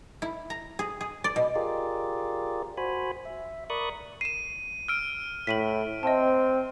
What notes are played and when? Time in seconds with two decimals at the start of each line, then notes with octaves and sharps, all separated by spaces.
0.22 E4
0.50 A#5
0.79 G#4
1.01 G#4
1.24 D5
1.36 B2
1.56 F4 G4 G#4 A#4 D5
2.77 F#4 C5 G#5 B5
3.25 E5
3.70 A#4 D5 B5 C#6 D#6 F#6
4.21 C7 D#7 E7
4.88 E6 F6 D7
5.47 A2 B6 D#7 F#7
6.03 C4 D#5 E5 A5